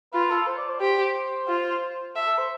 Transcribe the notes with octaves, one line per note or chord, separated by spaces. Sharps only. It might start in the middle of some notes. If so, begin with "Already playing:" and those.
F4 B4
A4
C5
D5
C5
G4 C5
F4
A4 E5
A4
C5